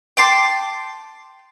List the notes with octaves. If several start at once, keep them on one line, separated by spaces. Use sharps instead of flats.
G5 A5 C6 D6